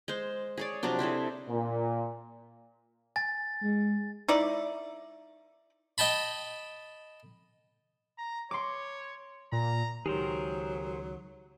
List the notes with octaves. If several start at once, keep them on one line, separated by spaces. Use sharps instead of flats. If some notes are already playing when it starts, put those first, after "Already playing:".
G#3 C5
G#4 C#5 D5
C3 F3 F#3 D4
C4 E4 G#4 A4
A#2
G#5 A6
G#3
D#4 E4 D5
D#5 G5 A5 B5
A#5
C#5 C6 D6
A#2 A#5
C#2 D#3 F#3 G4 G#4 A#4 C5